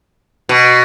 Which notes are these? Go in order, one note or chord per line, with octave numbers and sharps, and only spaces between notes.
B2